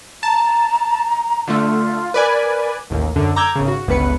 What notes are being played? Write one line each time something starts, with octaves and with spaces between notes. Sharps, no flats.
A5 A#5
D3 A3 F4
A#4 B4 D5 G#5
A1 D#2
F#2 D3
A#5 D6 E6 G6 G#6
G#1 C#3
F#4
G1 C#2 B3 B4 C#7